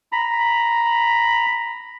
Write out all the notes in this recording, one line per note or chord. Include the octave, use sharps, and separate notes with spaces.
A#5 B5